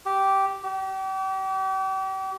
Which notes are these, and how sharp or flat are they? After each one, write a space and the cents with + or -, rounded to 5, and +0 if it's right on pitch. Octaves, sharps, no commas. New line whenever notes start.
G4 -10
G4 -40